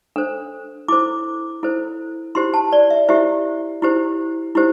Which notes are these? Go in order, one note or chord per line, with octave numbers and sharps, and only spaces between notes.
D4 A4 C5
E4 A4 C5 D6
E4 A4 C5
E4 G4 C5 C6
A5
D5
E5
E4 G4 C5 E5
E4 G4 C5
E4 G4 C5